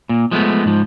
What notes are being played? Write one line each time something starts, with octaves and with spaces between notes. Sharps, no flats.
A#2
F3 G#3 A3 B3
G#2 F3